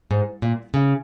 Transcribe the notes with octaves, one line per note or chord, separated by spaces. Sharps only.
G#2
A#2
C#3